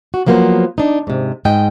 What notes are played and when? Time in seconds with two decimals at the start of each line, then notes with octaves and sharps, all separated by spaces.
0.14 F#4
0.26 F3 F#3 A#3 B3 A#4 C5
0.78 D4 D#4
1.07 G#2 C3
1.45 G#2 D#5 G5